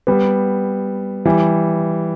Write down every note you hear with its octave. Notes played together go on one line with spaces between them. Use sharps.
G3 B3
E3 G3